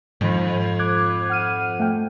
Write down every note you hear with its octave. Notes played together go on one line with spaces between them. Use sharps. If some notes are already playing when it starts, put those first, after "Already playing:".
F2 G#2 D#3 B5
D6 F#6 G#6
F#5 F6 D#7
A3 F#5 G5